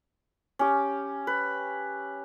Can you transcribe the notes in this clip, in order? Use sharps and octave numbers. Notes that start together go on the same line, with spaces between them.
C#4 G4
B4